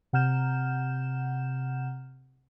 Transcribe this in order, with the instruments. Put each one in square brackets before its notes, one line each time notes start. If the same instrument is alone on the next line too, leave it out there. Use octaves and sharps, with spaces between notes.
[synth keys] C3 F#5 A#5 F6 G6 E7